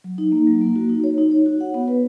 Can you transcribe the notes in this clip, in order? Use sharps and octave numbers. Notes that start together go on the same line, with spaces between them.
F#3
D#4
A#3
F#3
A#3
F#4
D#4
C#5
D#4
C#5
F#4
F#5
B3
B4